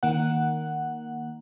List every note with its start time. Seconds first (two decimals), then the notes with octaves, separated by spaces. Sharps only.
0.03 D#3 A#3 F#5